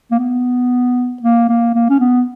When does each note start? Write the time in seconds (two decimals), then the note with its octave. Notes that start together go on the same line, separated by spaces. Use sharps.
0.11 A#3
0.19 B3
1.22 A#3
1.49 A#3
1.75 A#3
1.90 C#4
2.00 B3